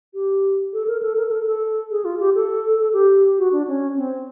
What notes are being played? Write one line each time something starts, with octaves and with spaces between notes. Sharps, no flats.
G4
A4
A#4
A4
A#4
A#4
A4
A4
G#4
F4
G4
A4
A4
G4
F#4
D4
C#4
C4